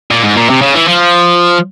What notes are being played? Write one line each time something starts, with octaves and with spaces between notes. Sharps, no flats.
A#2
G#2
A#2
C3
C#3
E3
F3